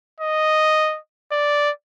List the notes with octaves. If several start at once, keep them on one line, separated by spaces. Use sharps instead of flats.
D#5
D5